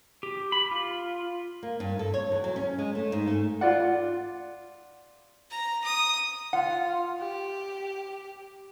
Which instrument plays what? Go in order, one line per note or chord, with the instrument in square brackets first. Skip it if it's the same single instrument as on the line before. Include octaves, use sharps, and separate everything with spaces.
[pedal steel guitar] G4
B5
F4
[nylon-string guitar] A#3
G2
A4
C#5
E2
F#3
C#4
G#3
A3
G#2
A3
[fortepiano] F4 D5 F#5
[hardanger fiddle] A#5
D#6
[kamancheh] F4 [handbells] F#5
[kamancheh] G4